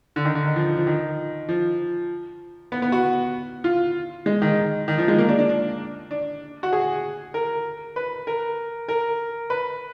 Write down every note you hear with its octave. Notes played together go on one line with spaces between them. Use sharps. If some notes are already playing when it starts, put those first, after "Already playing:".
D3
D#3
D3
D#3
F3
F3
D#3
F3
B3
B3
F#4
F4
G#3
D#3
D#3
F3
G#3
A#3
D4
D4
D4
D4
F#4
G#4
A#4
B4
A#4
A#4
B4